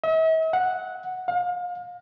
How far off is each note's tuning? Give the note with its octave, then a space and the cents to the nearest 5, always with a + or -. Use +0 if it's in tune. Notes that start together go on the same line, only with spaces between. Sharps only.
E5 -45
F#5 -5
F5 +35